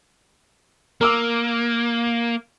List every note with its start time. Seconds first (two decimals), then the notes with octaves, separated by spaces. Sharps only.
1.01 A#3 A#4 D6 E6